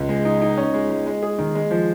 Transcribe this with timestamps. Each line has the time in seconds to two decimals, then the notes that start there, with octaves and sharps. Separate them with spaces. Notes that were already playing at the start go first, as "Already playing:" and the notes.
Already playing: C#2
0.09 G#3
0.25 D#4
0.42 D#4
0.57 C#4
0.74 G#3
0.90 G#3
1.06 G#3
1.23 G#4
1.38 D#3
1.55 G#3
1.71 F3